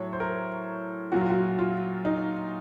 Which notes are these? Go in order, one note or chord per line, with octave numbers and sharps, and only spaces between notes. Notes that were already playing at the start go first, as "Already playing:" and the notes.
Already playing: A2 F#3 C#5
C5
A#4
A#2 F#3 F#4
F4
F#4
F4
D#4